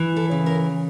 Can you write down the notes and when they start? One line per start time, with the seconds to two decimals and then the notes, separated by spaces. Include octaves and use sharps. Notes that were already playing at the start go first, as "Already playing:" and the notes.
Already playing: E3
0.16 A4
0.31 C#3
0.46 A#4